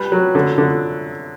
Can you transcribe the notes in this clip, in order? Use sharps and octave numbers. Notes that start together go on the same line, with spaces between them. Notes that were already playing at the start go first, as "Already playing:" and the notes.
Already playing: G3 B4
F#3
D3
D3